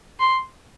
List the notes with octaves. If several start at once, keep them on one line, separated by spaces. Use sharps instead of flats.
C6